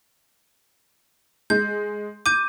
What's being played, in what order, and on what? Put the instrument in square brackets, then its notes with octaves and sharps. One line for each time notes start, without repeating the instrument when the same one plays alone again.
[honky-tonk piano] G#3 [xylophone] G6
[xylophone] D6 G6 [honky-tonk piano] D#7